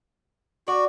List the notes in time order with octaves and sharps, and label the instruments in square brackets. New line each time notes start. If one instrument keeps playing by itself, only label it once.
[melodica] F#4 [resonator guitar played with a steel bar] D5